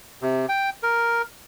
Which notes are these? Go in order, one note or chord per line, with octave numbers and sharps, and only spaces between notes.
C3
G5
A#4